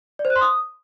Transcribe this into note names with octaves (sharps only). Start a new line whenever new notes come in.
D5
C5
F#6
C6
D#6